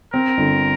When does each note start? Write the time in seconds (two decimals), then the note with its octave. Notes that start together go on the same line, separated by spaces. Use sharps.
0.13 C4 A#4
0.38 G1